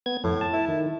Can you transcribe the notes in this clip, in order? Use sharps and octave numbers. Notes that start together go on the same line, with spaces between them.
B3 G#6
F2 A2
A5
E4
D#3